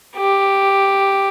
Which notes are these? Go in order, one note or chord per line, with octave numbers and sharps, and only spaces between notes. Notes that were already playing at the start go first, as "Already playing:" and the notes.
G4